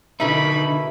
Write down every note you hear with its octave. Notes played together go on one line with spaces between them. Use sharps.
B2 D3 A#3 D#4 E4 B5